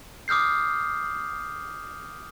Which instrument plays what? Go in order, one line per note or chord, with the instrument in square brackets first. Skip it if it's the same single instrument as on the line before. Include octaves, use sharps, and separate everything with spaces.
[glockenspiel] D6 D#6 F6 G6 C7